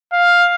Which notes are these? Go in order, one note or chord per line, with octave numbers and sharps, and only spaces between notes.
F5